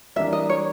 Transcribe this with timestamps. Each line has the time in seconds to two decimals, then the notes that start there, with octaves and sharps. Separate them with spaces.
0.16 E3 G3 A#3 D4 E5
0.33 D#5
0.49 C#5